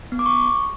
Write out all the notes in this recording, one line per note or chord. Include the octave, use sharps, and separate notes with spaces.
B3
D6
C#6